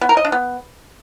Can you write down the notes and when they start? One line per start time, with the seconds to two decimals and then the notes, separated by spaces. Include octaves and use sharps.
0.01 B3
0.09 A#4
0.17 D#5
0.25 D4
0.32 B3